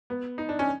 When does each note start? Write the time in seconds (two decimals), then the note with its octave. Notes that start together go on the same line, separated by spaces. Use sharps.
0.10 B3
0.38 D#4
0.49 D4
0.59 C#4